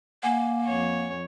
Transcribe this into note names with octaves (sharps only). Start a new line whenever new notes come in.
A#3 F#5 G#5
F2 C#5